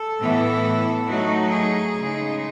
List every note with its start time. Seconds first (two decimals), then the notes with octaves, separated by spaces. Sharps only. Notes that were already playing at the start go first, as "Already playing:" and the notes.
Already playing: A4
0.20 A2 E3 B3 E4
1.07 F#3 A3 D#4 F#4
1.52 G#4
1.96 C#3 G#3 D#4